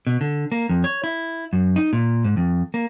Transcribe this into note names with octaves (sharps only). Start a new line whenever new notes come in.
B2
D3
A#3
F2
C#5
E4
F#2
D#4
A#2
G#2
F2
A#3